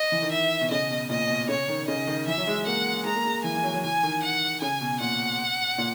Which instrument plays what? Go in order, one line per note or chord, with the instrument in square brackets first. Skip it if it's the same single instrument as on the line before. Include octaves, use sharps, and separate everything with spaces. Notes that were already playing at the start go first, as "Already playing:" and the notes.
Already playing: [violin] D#5
[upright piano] E3
D#3
[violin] E5
[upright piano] B2
[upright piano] C#3 [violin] D#5
[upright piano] B2
[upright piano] A#2 [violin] D#5
[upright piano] B2
[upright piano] C#3 [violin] C#5
[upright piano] D#3
[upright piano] C#3 [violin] D#5
[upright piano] D#3
[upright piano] E3 [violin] E5
[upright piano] F#3
G#3
[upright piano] A#3 [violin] F#5
[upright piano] G#3 [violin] A#5
[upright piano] A#3
G#3
[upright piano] E3 [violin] G#5
[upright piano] E3
F#3
F#3
[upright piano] E3 [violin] G#5
[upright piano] D#3
[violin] F#5
[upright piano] C#3 [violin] G#5
[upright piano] B2
[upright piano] A#2 [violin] F#5
[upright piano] A#2